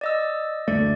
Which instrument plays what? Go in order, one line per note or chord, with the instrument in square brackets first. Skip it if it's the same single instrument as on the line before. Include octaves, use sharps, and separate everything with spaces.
[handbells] D5 D#5 E6
[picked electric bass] F#1 D2 A3 [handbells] D5